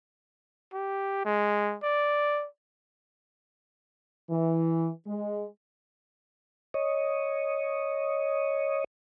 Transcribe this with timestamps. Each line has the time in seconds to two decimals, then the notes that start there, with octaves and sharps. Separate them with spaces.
0.74 G4
1.25 G#3
1.83 D5
4.30 E3
5.07 G#3
6.74 C#5 D#5